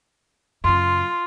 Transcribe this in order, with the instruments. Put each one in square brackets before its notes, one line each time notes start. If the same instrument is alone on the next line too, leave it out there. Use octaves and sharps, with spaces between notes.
[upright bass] F#2 C#3 [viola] F4 [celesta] C6